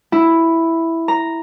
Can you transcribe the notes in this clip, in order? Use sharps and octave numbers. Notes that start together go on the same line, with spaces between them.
E4
A#5